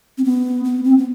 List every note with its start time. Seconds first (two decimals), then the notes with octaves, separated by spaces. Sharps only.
0.18 C4
0.24 B3
0.65 B3
0.84 C4
0.98 B3